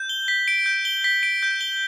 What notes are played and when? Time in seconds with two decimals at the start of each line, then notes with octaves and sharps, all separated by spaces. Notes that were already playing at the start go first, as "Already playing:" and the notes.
Already playing: G6
0.09 G7
0.28 B6
0.48 D7
0.66 G6
0.85 G7
1.04 B6
1.23 D7
1.43 G6
1.61 G7